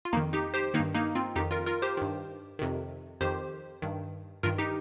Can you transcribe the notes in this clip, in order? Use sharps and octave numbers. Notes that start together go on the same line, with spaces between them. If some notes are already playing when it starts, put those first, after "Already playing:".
F4
F2 D#3 A#3 D#4
D#4 G4
G4 C5
D#3 A#3 D#4
G2
A#3 D#4
C4 F4
F2 D#3 D#4 G4
F4 A#4
F4 A#4
G4 C5
G2 D#3
F2 C3 D#3
F2 D#3 G4 C5
G2 D#3
G2 D#3 F4 A#4
D#4 G4